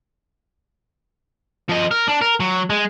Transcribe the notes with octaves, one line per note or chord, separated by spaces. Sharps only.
F3 D#5
A#4
D4
A#4
F#3
G#3